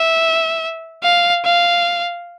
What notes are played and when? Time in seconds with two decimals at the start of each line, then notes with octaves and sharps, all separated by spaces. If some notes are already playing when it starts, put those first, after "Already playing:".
Already playing: E5
1.03 F5
1.44 F5